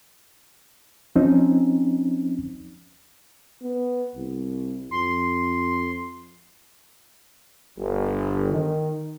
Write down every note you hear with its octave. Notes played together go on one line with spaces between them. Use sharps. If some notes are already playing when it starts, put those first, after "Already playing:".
F3 C4 C#4 D#4
B3
C2
F2 C6
G1
D#3